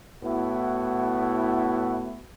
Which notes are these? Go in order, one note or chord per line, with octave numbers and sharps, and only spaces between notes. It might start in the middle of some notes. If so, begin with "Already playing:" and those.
A2 B3 E4 F#4